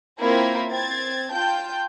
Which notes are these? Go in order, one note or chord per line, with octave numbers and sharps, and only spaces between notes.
A#3 C4 E4 F4 A#4 G#6
C4 G#6 A6
F4 G5 A5 G6